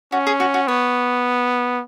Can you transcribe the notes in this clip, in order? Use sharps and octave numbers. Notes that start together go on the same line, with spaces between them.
C#4 F#4
G#4
F#4
F#4
B3 C#5